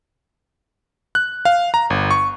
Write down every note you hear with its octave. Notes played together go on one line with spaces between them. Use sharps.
F#6
F5
A#5
G1
C#6